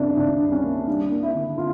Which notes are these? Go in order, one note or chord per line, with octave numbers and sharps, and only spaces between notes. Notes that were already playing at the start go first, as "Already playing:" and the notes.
Already playing: C#3 G3 A#3 D4 E4
C#2 D4
G3
C#4
A#3
G3 D4
A#3
E4
D3
F4